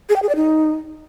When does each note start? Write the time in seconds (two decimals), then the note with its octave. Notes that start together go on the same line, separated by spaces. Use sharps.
0.09 G#4
0.16 G5
0.22 G#4
0.29 D5
0.36 D#4